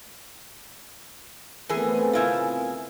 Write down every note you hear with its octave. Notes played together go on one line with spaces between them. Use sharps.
E3 A3 B3 C4 G#4 A#4 G#5
C#3 E4 F4